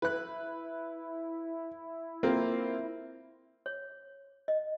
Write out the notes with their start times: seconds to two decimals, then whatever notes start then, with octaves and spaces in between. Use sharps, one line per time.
0.02 E4 B4 F#6
2.23 A#3 C4 F4
3.66 C#5
4.48 D#5